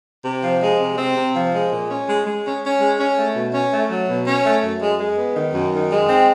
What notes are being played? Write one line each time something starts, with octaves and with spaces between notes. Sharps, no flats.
C3
F3
G#3
C3
C4
C3
F3
G#3
A#2
C#4
G#3
G#3
C#4
C#4
G#3
C#4
A3
B2
C#4
A3
F#3
B2
C#4
A3
F#2
G#3
G#3
B3
D#3
F#2
D#3
G#3
C4